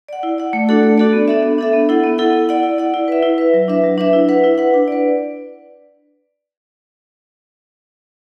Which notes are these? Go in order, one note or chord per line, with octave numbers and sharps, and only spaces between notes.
D5 F#5
E4
D5 F#5
A3
D4 F#4 A4 D5
A3
D4 F#4 A4 D5
B3
D4 A4 E5
B3
D4 A4 E5
B3
E4 A4 F#5
B3
E4 A4 F#5
E4
D5 F#5
E4
D5 F#5
E4
B4 E5
E4
B4 E5
F#3
D4 B4 E5
F#3
D4 B4 E5
E4
B4 F#5
E4
B4 F#5
D4
B4 D5